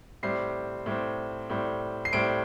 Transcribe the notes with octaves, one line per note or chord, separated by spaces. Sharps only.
A2 G3 C4 C7
A2 G3 C4
A2 G3 C4
C7
A2 G3 C4 D7